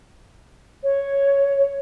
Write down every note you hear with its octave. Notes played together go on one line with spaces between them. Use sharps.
C#5